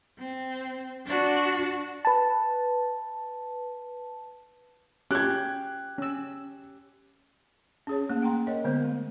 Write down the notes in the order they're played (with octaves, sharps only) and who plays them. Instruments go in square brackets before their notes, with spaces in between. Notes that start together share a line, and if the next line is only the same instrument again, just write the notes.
[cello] C4
D4 F#4
[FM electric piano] B4 A5
[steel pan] C#4 [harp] G4 [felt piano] F#6 G#6
[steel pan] C#4 E6
[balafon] C#4 G#4 C#5
A3 A#3 C#4
F#5 G5 A#5 C6
A#4 C#5 D#5
D3 G#3 B3 C5
A3